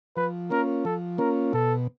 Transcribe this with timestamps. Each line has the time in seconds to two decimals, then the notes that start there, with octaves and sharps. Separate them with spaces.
0.16 F3 B4
0.50 A#3 C#4 F4 A#4
0.85 F3 A4
1.18 A#3 C#4 F4 A#4
1.53 B2 A4